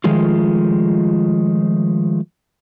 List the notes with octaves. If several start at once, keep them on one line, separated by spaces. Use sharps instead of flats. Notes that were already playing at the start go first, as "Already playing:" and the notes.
D#3 F3 G#3 A3 F4